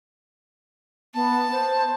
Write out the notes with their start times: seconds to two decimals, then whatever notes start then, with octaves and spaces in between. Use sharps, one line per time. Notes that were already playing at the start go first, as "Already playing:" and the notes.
1.14 B3 A5
1.51 C5